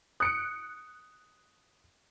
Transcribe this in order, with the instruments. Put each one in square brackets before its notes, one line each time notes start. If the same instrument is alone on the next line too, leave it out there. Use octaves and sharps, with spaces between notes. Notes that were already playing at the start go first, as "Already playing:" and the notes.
[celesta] D#6 [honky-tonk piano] F#6 C#7 D7